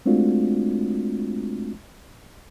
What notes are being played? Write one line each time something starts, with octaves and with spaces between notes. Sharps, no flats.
G#3 A3 C4 D4 F4 F#4